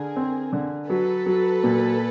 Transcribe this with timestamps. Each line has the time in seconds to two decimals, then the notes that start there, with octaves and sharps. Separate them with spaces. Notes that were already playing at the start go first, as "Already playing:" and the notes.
Already playing: D3 G#4 A#4
0.16 C4
0.53 D3
0.89 F#3 A4 B4
1.26 F#3
1.64 A#2